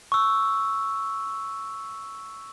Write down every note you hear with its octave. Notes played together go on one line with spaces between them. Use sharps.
C#6 E6